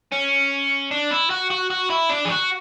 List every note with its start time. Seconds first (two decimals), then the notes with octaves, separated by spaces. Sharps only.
0.12 C#4
0.91 D4
1.11 E4
1.30 F#4
1.50 F#4
1.70 F#4
1.90 E4
2.09 D4
2.25 G#4
2.30 F#4